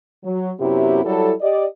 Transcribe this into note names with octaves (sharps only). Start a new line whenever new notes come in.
F#3
F#2 C3 F#3 B3 E4 G4
F#3 G3 E4 A4
G4 D5 D#5